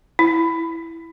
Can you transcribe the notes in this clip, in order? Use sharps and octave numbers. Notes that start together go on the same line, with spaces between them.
E4